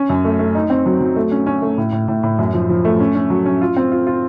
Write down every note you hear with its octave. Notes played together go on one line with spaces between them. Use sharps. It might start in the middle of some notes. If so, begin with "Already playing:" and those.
Already playing: C#4
F#2
A3
A3
D#4
C4
F#3
F#3
A3
C#4
C#4
A3
A2
A2
A2
A2
F#2
F3
F3
A3
C#4
C#4
F#3
C#4
F4
C4
F4
F4